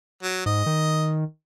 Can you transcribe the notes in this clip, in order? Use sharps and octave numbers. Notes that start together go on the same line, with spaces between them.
F#3
G#2 D#5
D#3